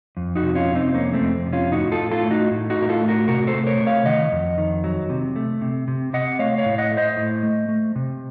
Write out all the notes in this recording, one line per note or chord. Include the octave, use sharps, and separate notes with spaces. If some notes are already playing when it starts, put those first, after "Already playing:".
F2
D#4 F#4
C3
C#4 F4
C3
C4 D#4
F2 A#3 C#4
A3 C4
F2
C3
C#4 F4
A2 D#4 F#4
F4 A4
A2
F4 A4
A3
D#4 F#4
A2
D#4 F#4
A2
A#4
F4 A4
A3
F#4 A#4
C3 F#4 A#4
A4 C5
A3
A#4 C#5
C3
C#5 F5
D#3 D#5 F#5
F2
D#3
F#3
C3
A3
C3
C3
C3 D#5 F#5
A3 C#5 F5
C#5 F5
A2
D#5 F#5
A3
C5 D#5
A2
A3
A3
C3